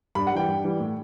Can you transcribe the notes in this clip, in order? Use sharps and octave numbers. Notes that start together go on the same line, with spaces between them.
G2 B5
F#5
E3 G3 G5
G2
E3 G3
A2